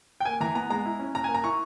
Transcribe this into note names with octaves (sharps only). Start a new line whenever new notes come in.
G5
A#3 G#5
E3 A#5
B3 A#5
G#3 A#5
E4
C#4
C#4 A#5
G#5
A#3
A#5
E4 C#6